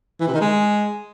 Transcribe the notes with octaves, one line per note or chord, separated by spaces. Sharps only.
E3
C3
D#3
G#3